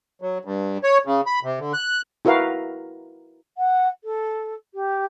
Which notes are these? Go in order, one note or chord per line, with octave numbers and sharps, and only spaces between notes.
F#3
G2
C#5
C#3
B5
C3
D3
F#6
E4 F#4 A#4 B4 F5
F#5
A4
G4